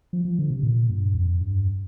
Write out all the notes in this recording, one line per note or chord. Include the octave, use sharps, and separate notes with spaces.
F3
F3
D3
C3
A#2
G2
F2
G2